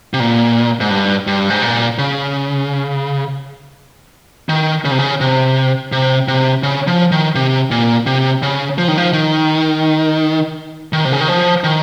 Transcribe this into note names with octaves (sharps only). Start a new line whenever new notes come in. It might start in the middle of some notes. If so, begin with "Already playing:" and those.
C3
A#2
G#2
G2
G2
G#2
A#2
C#3
D#3
C#3
C3
C#3
C3
C3
C3
C#3
F3
D#3
C3
A#2
C3
C#3
F3
D#3
F3
D#3
D#3
C3
C#3
D#3
F3
D#3